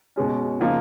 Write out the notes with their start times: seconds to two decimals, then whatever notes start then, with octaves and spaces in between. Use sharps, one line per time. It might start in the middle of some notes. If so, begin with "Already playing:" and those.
0.16 B2 G#3 C#4
0.59 C#3 F3 A#3 D#4